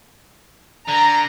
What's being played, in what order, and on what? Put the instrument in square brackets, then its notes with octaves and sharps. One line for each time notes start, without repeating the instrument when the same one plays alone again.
[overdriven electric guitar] D3 [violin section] A#5